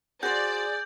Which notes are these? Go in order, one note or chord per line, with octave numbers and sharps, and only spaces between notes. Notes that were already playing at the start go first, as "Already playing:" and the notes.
F#4 G#4 C5 D5 G6